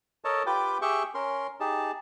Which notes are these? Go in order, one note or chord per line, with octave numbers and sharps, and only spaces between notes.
A4 A#4 C#5 D#5 A5
F4 G4 B4 G5 D6
G4 G#4 E5 G5 C#6
C#4 A#4 C6
D#4 G4 G#4 A5